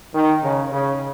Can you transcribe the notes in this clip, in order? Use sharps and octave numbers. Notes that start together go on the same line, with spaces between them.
D#3
C#3
C#3